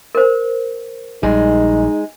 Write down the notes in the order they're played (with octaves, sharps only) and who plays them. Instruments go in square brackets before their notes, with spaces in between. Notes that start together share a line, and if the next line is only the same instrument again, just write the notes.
[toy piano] A#4 C5
[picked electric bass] A#1 G3 [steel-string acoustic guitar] G#3 [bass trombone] D#4